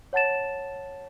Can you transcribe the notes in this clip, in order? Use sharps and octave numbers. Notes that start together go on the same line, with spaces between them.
C#5 F#5 A5 A6 E7